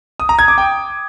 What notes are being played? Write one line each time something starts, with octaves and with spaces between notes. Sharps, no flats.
D#6
A#5
G#6
D6
G5